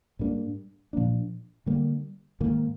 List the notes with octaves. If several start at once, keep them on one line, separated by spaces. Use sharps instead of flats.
G#2 G3 A#3 D4
A#2 F3 A#3 D4
D3 G3 A#3
G#2 D#3 A#3